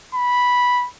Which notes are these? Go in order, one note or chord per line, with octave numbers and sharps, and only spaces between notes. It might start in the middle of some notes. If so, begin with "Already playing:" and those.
B5